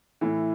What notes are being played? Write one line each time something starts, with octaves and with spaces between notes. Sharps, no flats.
A2 E3